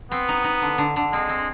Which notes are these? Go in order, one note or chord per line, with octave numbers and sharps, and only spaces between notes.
B3 C4
D#4
D#4
D3
D3
D3
G#3 C4
C4